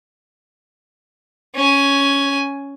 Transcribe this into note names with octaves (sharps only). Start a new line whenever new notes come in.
C#4 G#5